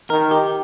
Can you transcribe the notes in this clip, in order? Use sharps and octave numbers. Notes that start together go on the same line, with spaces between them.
D#3 A#4
G4